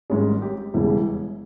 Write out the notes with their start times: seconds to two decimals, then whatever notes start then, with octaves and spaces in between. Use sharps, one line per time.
0.10 G#1 G#2 G3 C#4 G#4
0.42 G4
0.74 E1 E2 C#3 G3 E4